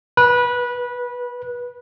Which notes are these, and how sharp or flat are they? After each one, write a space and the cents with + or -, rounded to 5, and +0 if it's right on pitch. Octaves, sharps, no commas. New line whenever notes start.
B4 -20